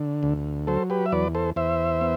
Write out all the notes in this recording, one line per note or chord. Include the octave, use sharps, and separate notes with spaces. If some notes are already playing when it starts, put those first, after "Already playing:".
Already playing: D3
D2
F#3 A4 C5
G4 B4
E5
E2 B4 D5
A4 C5
E2 C5 E5
B3